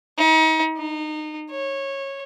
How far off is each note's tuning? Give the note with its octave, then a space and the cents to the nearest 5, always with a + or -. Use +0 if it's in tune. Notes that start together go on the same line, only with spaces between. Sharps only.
D#4 +35
D#4 -25
C#5 -15